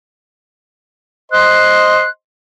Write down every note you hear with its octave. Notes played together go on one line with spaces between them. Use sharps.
C5 D#5 C6 F#6